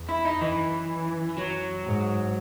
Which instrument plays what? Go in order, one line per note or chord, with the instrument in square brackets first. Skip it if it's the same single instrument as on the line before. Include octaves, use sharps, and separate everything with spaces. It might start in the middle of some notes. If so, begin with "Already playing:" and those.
Already playing: [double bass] E2
[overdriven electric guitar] E4
D#4
[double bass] F#2 [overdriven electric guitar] E3
[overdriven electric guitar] F#3
[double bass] G#2